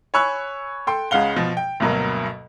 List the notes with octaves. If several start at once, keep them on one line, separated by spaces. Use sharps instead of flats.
C#5 G#5 B5 C#6 E6 F#6
A4 G5 C6
C#2 C#3 G#3 F5 F#5 G7
B2 F3
G5
D2 G2 B2 F#3 A#3